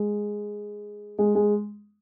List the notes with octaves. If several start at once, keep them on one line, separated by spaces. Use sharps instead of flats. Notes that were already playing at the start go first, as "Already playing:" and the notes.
Already playing: G#3
G#3
G#3